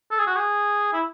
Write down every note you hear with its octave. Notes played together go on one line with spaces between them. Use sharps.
A4
G#4
F#4
G#4
E4